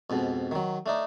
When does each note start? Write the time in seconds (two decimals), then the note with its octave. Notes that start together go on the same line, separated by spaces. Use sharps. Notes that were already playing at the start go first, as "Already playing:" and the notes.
0.10 F2 G#2 B2
0.51 D#3 F#3
0.86 A3 D4 D#4